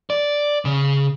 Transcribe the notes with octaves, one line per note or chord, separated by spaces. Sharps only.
D5
C#3